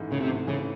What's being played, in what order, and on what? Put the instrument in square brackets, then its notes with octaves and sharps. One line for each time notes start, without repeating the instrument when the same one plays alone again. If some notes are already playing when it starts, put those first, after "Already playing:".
Already playing: [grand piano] A1 G#2 E3 A3
[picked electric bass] C#3 [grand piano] A3
[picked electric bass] C3
[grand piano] A1
[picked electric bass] C#3 [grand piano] E3